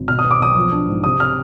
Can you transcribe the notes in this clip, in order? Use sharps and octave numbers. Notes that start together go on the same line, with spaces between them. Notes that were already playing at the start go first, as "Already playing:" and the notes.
Already playing: G#1
B2 F6
D#6
B3
D6
B1 D#6
F3
D4
G#2
C3 D#6
F6